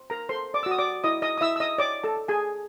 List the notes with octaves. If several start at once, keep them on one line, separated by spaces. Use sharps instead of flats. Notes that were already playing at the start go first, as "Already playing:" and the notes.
Already playing: C5
A#4 A#5
A4 C5 C6
D5 D6
E6
F#4 D#6
D5 D6
E4 D#5 D#6
D#5 D#6
D#6
E4 E5 E6
E6
D#5 D#6
C#5 D5 D6
A4 A5
A4
G#4 G#5